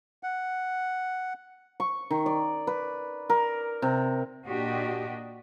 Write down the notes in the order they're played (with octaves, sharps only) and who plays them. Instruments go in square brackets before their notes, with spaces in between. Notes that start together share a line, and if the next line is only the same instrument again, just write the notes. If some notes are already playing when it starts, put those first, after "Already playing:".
[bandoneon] F#5
[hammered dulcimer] C#6
D#3
D5
B4
A#4
C3
[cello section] A#2 D4 F#4 G4 D#5